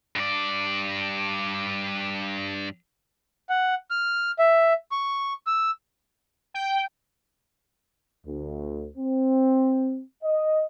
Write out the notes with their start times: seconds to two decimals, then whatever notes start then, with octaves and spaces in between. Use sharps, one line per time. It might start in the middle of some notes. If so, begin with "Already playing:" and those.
0.16 G2 D5
3.49 F#5
3.90 F6
4.39 E5
4.92 C#6
5.47 E6
6.54 G5
8.27 D2
8.97 C4
10.24 D#5